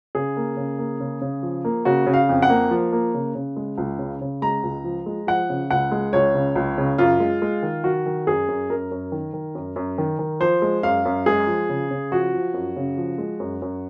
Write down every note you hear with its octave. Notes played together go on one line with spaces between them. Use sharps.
C#3 G#4
A#3
C#3
A#3
C#3
C#3
F3
A#3
C#3 F#4
C#3
F5
F2
F#5
A#3
F3
A#3
C#3
C#3
G#3
C#2
C#3
C#3
G#3 A#5
C#2
F3
G#3
F3 F#5
C#3
C#2 F#5
G#3
C#2 C#5
C#3
C#2
C#3
F#2 F4
G#3
G#3
D#3
D#3 F#4
D#3
F#2 G#4
F#2
F#2 A#4
F#2
D#3
D#3
F#2
F#2
D#3
D#3
F3 C5
G#3
F#2 F5
F#2
G#3 G#4
F3
C#3
C#3
F3 F#4
F3
F#2
C#3
F3
G#3
F#2
F#2